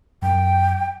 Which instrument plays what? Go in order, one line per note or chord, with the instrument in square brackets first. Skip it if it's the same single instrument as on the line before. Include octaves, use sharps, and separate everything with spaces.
[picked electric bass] F#2 [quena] G5